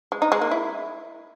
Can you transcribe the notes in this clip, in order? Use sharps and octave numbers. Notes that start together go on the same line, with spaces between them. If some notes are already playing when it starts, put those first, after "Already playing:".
G#3
D#4
G#3
A#3
E4